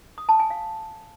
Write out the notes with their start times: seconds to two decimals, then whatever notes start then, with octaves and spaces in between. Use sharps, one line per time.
0.18 D#6
0.29 A5
0.40 G#5
0.50 F5